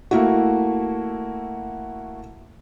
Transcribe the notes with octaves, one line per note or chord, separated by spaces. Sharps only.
A3 A#3 E4 F#4